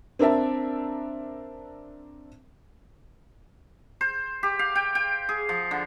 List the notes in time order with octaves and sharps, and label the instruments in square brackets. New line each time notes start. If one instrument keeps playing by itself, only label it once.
[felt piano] C4 D4 A#4 E5 A5
[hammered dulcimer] C5
G4
F5
G5
G5
G#4
F3
D3